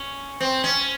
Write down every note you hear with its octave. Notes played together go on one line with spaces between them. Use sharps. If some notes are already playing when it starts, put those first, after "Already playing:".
Already playing: C#4
C4
C#4